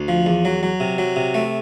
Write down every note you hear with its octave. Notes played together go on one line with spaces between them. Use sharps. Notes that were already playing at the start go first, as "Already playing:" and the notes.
Already playing: D2
F3
E2
F#3
F#3
C3
F#3
C3
A3